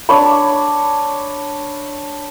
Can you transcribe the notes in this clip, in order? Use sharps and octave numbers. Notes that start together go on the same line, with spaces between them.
D4 C#5 B5